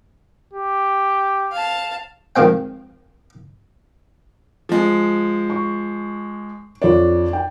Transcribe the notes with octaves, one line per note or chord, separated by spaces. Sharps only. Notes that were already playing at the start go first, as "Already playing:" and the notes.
G4
F5 A5
F2 D#3 G#3 C4 G5
F3 G#3
C#6
F2 D4 C#5
G5